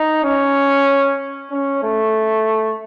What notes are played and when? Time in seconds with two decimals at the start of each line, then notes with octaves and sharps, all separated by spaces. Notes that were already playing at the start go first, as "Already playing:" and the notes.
Already playing: D#4
0.24 C#4
1.51 C#4
1.83 A3